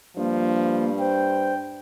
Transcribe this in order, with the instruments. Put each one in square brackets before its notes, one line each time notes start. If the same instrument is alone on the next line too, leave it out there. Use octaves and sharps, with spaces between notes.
[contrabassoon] G2 [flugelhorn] F3 [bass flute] A#3
[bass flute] C5 [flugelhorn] G5